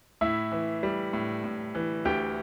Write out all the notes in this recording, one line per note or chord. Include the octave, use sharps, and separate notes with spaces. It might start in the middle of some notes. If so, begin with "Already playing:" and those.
A2 E4 E5
E3
G3
A2
A2
E3
D2 G4 G5